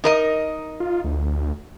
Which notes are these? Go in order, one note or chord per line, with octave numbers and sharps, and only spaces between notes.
D#4 A#4 D#5
F4
D2